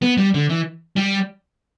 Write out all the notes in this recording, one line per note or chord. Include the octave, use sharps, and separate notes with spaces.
B3
G3
D3
E3
G3